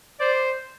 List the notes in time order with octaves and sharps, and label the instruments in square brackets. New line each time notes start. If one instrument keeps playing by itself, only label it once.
[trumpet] C5 [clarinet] D5